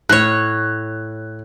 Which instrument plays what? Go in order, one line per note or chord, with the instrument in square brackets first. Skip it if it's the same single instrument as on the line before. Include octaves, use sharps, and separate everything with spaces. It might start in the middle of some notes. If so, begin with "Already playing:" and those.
[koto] A2 C#5 [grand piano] F#6